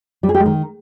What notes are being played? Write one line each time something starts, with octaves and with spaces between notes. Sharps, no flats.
G3
G#4
G4
G#3
D#3